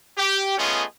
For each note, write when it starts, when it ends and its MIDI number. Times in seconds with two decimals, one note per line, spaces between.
0.17 0.55 67
0.57 0.84 57
0.57 0.84 59
0.57 0.84 61
0.57 0.84 65
0.57 0.84 68
0.57 0.84 75